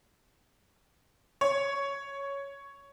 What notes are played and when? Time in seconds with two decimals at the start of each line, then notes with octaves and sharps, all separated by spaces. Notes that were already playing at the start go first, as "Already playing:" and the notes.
1.41 C#5